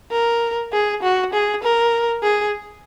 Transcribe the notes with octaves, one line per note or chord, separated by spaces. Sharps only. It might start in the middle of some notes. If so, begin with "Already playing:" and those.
A#4
G#4
F#4
G#4
A#4
G#4